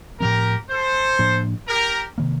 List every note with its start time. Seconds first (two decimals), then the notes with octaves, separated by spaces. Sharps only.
0.20 A2 F3 C4 G4 A#4
0.70 A4 C5
1.19 A2 F3 A#3 D4
1.68 G4 A#4
2.18 C3 D#3 A#3